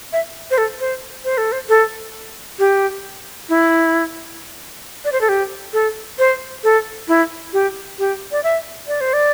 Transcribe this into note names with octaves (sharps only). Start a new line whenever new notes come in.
E5
C5
A4
C5
C5
A4
C5
A4
G4
E4
D5
C5
A4
G4
A4
C5
A4
E4
G4
G4
D5
E5
D5
C5
D5